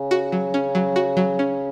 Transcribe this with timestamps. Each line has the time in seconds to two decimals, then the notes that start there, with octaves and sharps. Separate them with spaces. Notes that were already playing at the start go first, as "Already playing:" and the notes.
Already playing: C#3
0.11 F#4
0.32 F#3
0.54 C#4
0.75 F#3
0.96 F#4
1.17 F#3
1.39 C#4